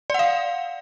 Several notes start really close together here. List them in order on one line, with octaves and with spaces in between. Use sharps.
D5 F#5 F5